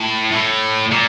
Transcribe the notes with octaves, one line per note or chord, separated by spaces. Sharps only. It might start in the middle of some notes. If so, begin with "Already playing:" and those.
Already playing: A2
A2
A#2